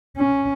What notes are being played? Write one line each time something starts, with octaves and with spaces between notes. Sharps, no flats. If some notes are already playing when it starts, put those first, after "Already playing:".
C#4